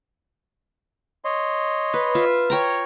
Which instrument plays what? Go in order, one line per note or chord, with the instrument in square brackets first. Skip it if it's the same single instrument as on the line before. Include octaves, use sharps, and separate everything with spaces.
[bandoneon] C#5 D#5 C6
[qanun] B4
F4 E5
C#5 G5 A#5